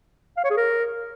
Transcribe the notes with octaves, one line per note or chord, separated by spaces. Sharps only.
F5
C#5
G#4
A#4